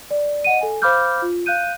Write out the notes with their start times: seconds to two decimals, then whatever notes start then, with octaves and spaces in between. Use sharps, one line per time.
0.11 D5
0.44 D#5 F#5 D#7
0.61 A4 G#5
0.82 C5 F5 B5 D6 F6 G6
1.22 F4
1.46 F5 F#6 G6 D#7